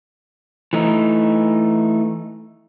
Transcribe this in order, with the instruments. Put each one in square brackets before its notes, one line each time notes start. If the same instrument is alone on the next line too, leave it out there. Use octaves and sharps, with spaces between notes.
[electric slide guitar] E3 A3 D#4